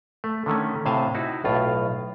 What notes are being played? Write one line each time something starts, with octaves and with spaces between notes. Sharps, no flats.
A3
D3 D#3 A3 C#4
A2 C3 C5 F5 G#5 A5
D#4 E4 F#4
B1 A2 F4